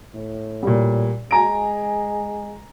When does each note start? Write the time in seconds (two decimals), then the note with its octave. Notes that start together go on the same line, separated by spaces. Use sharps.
0.15 A2
0.63 A#2 G3
1.31 G#3 G#5 A#5 D7